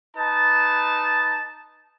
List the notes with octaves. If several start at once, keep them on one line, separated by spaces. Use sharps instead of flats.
D#4 B4 A5